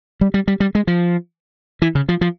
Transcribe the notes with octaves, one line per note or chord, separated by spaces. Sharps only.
G3
G3
G3
G3
G#3
F3
E3
C#3
F3
F3